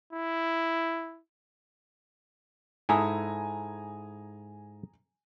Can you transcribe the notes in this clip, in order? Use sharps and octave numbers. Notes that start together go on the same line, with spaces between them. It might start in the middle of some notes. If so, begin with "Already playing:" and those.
E4
G#2 E4 A4 G#5 A#5 D#6